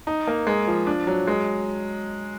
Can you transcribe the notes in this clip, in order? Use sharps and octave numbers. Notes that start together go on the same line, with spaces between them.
D#4
A#3
G#3
F3
D4
F#3
G#3